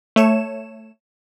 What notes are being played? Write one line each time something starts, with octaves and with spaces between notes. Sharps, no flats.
A3 C#5 E7